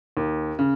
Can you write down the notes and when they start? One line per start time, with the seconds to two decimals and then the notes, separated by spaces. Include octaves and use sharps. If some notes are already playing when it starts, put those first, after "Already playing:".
0.17 D#2
0.59 C#3